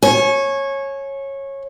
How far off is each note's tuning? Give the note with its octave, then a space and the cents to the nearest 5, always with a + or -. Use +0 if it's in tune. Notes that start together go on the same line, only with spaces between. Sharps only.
C#5 -15 G#5 +35